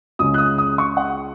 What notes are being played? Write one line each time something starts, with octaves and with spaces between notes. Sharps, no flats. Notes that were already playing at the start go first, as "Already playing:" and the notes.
C#2 C#3 G#3 D#6
F#6
D#6
D#6
C#6
F#5